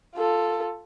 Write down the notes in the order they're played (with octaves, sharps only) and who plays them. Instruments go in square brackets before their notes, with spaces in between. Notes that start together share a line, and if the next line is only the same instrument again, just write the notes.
[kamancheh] F4 A4